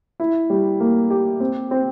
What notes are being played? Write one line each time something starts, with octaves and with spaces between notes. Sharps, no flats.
E4
G3
A#3
G4
C4
C4